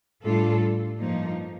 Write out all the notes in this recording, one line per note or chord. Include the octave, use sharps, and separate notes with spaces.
A2 G3 D4 F4 A4
G2 F3 A#3 D#4